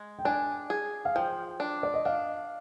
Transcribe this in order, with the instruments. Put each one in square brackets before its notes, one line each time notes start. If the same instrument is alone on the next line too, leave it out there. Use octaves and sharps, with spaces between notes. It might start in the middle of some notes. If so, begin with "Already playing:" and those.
Already playing: [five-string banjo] G#3
[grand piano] G5
[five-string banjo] D4 [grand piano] G#5
[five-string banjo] G#4
[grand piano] F5
[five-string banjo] F3 [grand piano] G5
[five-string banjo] D4
[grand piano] D5
D#5
[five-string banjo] D4 [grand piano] F5